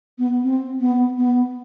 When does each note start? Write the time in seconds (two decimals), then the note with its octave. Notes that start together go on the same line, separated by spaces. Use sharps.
0.18 B3
0.43 C4
0.80 B3
1.18 B3